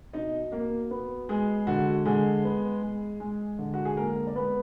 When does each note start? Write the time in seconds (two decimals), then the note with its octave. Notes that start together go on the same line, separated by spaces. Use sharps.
0.13 B2 D#4 D#5
0.52 B2 A#3 A#4
0.91 B3
1.29 G#3 G#4
1.67 D3 F#4
2.06 D3 G#3 G#4
2.44 B3
2.82 G#3
3.20 G#3
3.59 D3
3.74 F#4
3.85 G#4
3.97 G#3 A#3 A#4
4.27 D5
4.36 G#3 B3 B4